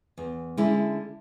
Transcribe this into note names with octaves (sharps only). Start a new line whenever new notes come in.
E2
D3 G#3 C#4 E4